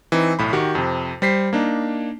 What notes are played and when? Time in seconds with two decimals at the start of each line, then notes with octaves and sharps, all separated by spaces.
0.12 E3 C4 D#4
0.39 B1 A2 B5
0.53 D#3 F#4 G4
0.75 F2 C3
1.22 G3 C5 B6 C7
1.53 A#3 D4 D#4